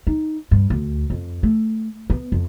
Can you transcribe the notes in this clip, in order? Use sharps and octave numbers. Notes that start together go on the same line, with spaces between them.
D#4
G2
D2
F2
A3
B3
F2